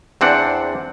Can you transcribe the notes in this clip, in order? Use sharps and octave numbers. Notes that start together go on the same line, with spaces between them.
E2 C4 D4 F#5